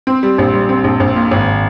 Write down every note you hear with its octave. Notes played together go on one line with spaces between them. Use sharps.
C4
G3
A#1
G3
C4
A#1
A#1
A#2
G#1